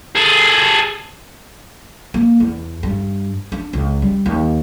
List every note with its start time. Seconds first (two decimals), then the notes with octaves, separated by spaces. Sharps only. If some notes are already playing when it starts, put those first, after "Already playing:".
0.16 G#4 A4
2.14 A#3
2.40 E2
2.83 G2
3.52 D4
3.73 C#2
4.02 G3
4.26 D#2